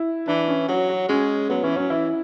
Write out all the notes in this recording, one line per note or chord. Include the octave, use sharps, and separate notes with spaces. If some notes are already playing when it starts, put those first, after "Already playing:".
Already playing: E4
E3 D4
C#4
F#3 F#4
F#4
G#3 C#4
F#3 B3
E3 C#4
F#3 C#4
E3 E4